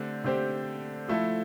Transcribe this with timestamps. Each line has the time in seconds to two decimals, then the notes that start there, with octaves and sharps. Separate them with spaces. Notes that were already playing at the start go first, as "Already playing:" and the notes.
Already playing: D3 A3 C4 G4
0.24 D3 A3 C4 G4 C5
1.08 F3 A3 E4 A4